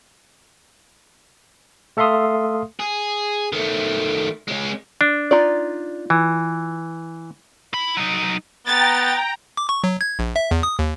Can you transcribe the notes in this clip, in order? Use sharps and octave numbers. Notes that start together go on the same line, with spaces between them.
A3 A4 E5 F5 C6 D#6
G#4
D#3 A3
G#3 C#4
D4
D#4 F4 D5
E3
E4 B5
F#3 D#4
B3 G5 A#5 A6
D6
C#6
F#3
G#6
A#1
E5
E2
D#6
D#2